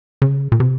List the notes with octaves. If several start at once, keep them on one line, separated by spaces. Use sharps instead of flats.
C#3
A#2
C3